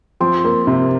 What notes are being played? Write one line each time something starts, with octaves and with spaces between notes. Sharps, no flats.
F3 C4
A#3
C3